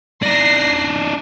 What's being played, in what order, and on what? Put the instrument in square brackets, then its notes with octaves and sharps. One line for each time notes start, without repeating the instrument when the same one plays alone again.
[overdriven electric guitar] D4 D#4 [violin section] A#6 C7